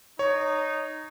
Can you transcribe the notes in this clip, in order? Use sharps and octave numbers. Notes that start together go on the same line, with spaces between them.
D#4 C#5